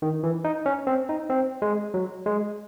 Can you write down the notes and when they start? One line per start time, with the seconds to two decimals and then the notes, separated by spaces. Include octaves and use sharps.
0.02 D#3
0.23 E3
0.44 D#4
0.66 C#4
0.87 C4
1.09 D#4
1.30 C4
1.62 G#3
1.94 F#3
2.26 G#3